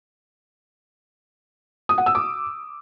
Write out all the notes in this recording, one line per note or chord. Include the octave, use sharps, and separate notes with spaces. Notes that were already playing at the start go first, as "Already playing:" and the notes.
D#6
F#5
E6
D6